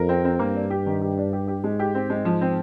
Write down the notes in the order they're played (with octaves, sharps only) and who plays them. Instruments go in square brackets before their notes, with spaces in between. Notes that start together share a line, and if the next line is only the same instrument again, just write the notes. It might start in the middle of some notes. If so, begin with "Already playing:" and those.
Already playing: [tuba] F2 [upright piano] A#4
[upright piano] C4
C4
[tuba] G2 [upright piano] A#3
[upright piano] D4
G4
D#3
G4
D4
G4
G4
[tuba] G#2 [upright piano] G#3
[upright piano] G4
C4
G#3
F3
C4